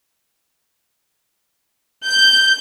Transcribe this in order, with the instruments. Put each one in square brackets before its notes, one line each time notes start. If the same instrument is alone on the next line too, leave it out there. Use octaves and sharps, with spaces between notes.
[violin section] G6